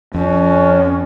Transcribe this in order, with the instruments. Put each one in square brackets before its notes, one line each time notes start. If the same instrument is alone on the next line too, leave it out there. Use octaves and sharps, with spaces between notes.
[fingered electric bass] F2 [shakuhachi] C#4